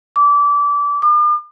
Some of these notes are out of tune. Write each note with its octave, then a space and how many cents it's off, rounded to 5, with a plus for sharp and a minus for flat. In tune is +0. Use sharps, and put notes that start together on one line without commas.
D6 -25
D6 +45